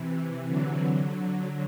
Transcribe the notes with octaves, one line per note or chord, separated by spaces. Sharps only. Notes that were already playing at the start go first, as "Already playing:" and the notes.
Already playing: C3 E3
D3 F#3
D3